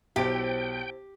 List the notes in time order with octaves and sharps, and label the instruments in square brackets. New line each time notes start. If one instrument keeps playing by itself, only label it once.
[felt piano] B1 [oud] E4 C5 [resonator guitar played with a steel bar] G4 [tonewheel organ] G5